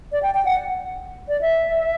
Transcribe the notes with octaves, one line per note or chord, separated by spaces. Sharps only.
D5
G5
G5
F#5
D5
E5